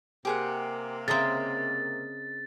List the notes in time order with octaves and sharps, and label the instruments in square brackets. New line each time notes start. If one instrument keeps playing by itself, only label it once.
[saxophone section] C3 A#3 [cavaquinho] G4 G#4 F#5
[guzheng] C#3 C4 [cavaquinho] A#4 D#5 E5 [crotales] A6